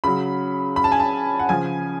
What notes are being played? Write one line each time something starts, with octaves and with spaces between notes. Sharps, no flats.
C#3 F#3 B5
B5
A5
G#5
A5
F#5
C#3 F3 G#5